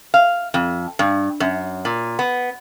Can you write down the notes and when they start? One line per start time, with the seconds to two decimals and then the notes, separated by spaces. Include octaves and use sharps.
0.14 F5
0.54 F2
0.99 G2
1.40 F#2
1.85 A#2
2.19 B3